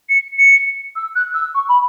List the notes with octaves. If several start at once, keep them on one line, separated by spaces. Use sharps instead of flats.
C#7
C#7
E6
F#6
E6
C#6
B5